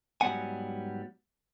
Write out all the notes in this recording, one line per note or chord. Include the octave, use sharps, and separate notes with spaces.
G#2 F#3 G3 B3 F#5 G#5